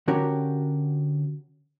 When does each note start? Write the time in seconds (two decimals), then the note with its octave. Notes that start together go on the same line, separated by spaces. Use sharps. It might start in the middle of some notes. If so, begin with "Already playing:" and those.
0.08 D3 C#4 F#4 G4 A#4 C#5